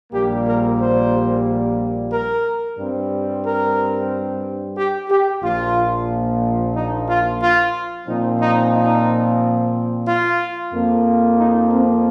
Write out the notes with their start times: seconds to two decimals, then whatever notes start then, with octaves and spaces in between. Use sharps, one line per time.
0.12 A#1 A#2 G3 A#3 G4
0.46 A#4
0.79 C5
2.11 A#4
2.77 G2 G3 C4
3.44 A#4
4.76 G4
5.09 G4
5.42 A#1 A#2 F3 F4
6.74 D#4
7.08 F4
7.41 F4
8.07 A#2 F3 C4 D#4
8.40 D#4
8.73 D#4
10.06 F4
10.72 F2 F3 A#3
11.38 D#4
11.71 C4